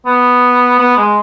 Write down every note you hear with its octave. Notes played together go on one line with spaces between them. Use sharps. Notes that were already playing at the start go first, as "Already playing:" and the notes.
B3
B3
G#3